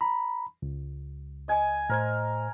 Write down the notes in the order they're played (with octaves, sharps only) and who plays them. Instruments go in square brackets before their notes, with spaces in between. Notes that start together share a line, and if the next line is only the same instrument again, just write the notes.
[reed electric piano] A#5 B5
C#2
[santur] D#5 G#5
[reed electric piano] A2 C5 G#6 [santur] A#4